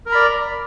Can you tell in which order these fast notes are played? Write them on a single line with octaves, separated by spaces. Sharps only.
A#4 A#5 B5 D5